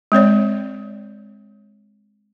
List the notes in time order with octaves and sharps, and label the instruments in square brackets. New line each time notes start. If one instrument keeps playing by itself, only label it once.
[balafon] G#3 C4 C#5 D5